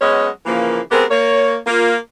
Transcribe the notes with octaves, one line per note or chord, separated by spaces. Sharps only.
F#3 G#3 B3 C#4 C#5 D#5
C#3 E3 F3 A#3
G#3 B3 C4 G4 G#4 A#4
A#3 C#5
A#3 F4